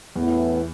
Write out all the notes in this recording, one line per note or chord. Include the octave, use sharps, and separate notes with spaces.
E2 A2 E3 B3 E4